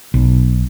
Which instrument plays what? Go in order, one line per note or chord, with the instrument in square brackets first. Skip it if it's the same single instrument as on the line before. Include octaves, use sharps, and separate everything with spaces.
[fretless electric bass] B1